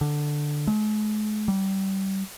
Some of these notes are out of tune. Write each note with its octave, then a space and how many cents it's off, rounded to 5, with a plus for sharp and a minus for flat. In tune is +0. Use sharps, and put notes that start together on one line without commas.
D3 +5
G#3 +45
G3 -25